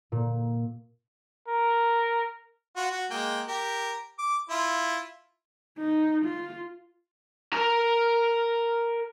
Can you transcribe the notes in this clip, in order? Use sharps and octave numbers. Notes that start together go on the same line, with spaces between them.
A#2
A#4
F4 F#4
F#4
G#3 A#3 G5
G4 A#4
D6
E4 F4
D#4
F4
A#4 A#5